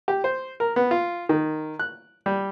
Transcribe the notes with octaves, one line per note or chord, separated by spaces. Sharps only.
G4
C5
A#4
B3
F4
D#3
F#6
G3